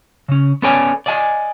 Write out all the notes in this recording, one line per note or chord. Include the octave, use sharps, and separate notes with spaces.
C#3 C#4
B3 C#4 A4 C#5 D5 G#5
D5 D#5 F5 G#5